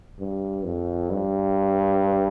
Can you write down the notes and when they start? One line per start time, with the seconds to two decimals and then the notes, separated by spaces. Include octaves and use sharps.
0.20 G2
0.65 F2
1.11 G2